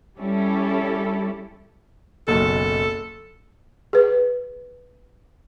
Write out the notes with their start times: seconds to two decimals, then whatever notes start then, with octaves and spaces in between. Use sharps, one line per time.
0.17 G3 C#4 E4 G4 A4
2.28 F#1 B1 F#2 A4
3.93 G#4 B4